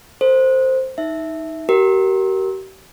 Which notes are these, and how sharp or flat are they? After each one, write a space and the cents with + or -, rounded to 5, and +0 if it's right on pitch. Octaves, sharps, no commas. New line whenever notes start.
A4 +45 C5 +0
D#4 +15 E5 -5
G4 -40 A#4 +0